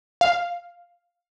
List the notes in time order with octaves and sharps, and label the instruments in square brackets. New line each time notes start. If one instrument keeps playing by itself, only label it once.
[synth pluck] F5